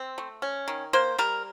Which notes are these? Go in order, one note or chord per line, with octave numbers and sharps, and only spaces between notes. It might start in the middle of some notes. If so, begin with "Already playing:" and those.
Already playing: C4 E5
A3
C#4
D#3
A#3 C5
G3 A#4